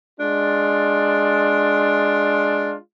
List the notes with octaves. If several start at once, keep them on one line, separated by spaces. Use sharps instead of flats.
G#3 D4 F4